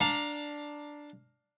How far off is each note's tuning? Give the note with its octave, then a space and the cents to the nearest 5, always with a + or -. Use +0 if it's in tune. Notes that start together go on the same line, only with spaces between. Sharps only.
D4 +0 F5 +15 A#5 +0